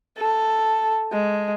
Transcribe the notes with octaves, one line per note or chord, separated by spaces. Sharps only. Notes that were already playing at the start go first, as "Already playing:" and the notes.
A4
G#3